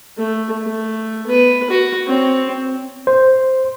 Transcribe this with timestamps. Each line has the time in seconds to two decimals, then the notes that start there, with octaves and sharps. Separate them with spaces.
0.18 A3
0.63 A3
1.26 B3 B4
1.70 F#4
2.07 C4 C#5
3.07 C5